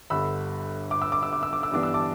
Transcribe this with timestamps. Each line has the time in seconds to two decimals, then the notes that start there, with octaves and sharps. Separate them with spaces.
0.10 G1 G2 D3 B5 E6
0.91 D6
1.02 E6
1.12 D6
1.23 E6
1.33 D6
1.43 E6
1.53 D6
1.63 E6
1.72 G2 E3 B3 D4 D6
1.83 E6
1.94 A5 D6